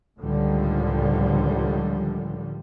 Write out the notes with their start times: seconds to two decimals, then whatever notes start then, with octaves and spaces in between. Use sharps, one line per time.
0.21 C#2 A2 D3 D#3 F3 G3